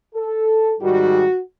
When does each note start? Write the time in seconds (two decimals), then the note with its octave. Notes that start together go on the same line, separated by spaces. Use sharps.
0.15 A4
0.80 G#2 D#3 G3 F#4